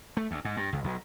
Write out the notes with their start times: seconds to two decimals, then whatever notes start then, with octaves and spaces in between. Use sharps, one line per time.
0.17 A3
0.31 D2
0.45 G#2
0.57 G2
0.73 C#2
0.84 B1